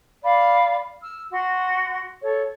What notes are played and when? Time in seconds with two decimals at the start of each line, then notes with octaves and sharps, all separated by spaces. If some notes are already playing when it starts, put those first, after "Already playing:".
0.24 D5 F5 B5
1.01 E6 F6
1.31 F#4 F#5 C6
2.22 A4 C#5